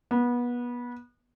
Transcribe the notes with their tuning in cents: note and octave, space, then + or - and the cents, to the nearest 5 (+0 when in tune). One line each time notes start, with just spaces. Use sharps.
B3 -25